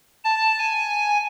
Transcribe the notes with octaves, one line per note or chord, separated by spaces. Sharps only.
A5
G#5